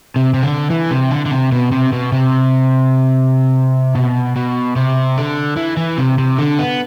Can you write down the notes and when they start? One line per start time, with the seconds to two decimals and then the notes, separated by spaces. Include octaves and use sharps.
0.16 C3
0.34 C3
0.43 D3
0.70 E3
0.91 C3
1.11 D3
1.26 D3
1.31 C3
1.52 B2
1.72 C3
1.93 B2
2.12 C3
3.95 B2
4.36 B2
4.76 C3
5.17 D3
5.57 E3
5.77 E3
5.98 C3
6.18 C3
6.38 D3
6.59 B3